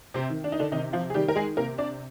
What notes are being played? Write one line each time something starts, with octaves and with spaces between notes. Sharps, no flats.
C3 C4
D#3
D4
D#4
D3 D4
C3 D#3 D#4
F3 F4
G#4
D#3 G3 G4
A#4
G#3 G#4
C3 A#3 A#4
D4 D5